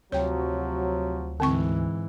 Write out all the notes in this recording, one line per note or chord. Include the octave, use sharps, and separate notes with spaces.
D2 C3 F3 F#3 C#5 G5
G#2 D3 E3 C4 C#6